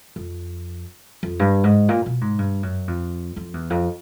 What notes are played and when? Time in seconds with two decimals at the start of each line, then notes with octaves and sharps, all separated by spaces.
0.16 F2
1.23 F2
1.40 G2
1.64 G#2
1.89 A#2
2.06 B2
2.21 G#2
2.38 G2
2.63 F#2
2.88 F2
3.36 F2
3.54 E2
3.70 F2